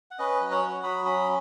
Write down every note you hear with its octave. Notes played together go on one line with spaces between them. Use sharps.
F#5
C#4 B4 D#5
F#3
C#5 F#5
F#4
F#3 B5 D#6
C#4 B5 D#6